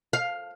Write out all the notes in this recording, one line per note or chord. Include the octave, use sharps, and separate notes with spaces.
F5